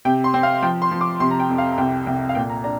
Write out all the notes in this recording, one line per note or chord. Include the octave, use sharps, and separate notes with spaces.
C3 G5
C6
C4
F5
F3 G5
C6
F3
D6
C3 C6
A#5
G5
F2
F5
A#5
C2 G5
C2 G5
F5
A#2 G5
A#5
D4 A#5